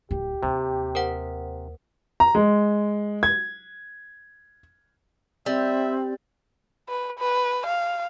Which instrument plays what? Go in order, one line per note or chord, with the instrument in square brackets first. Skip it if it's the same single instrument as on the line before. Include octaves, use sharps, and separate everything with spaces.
[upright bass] D1 [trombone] G4
[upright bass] D#2 [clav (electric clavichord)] C3
[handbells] A#4 C5 F#5
[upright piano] A#5
G#3
G#6
[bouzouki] G3 [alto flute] C4 [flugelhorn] E5
[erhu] B4
B4
F5